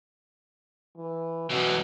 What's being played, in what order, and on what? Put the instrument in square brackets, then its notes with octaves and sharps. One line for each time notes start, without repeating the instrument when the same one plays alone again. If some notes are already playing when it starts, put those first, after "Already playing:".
[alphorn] E3
[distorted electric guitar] F#2 E3 [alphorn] B2